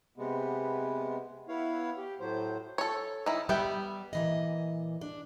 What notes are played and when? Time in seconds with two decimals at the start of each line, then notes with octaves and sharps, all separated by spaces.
0.18 C3 G#3 B3
1.49 B3 E4 C#5 F5
1.98 G4
2.20 A2 F#3 C5
2.78 A4 C#5
3.26 D#3 E4
3.49 G3 B3 E5 G5
4.13 A#2 E3 D#5
5.01 D4